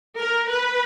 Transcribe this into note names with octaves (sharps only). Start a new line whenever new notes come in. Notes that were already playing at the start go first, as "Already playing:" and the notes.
A#4
B4